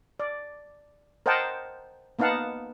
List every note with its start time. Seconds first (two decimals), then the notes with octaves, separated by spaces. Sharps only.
0.20 D5
1.26 A#4 C5 D#5 F#5 G5 A5
2.19 A#3 B3 D#4 F5 F#5 A5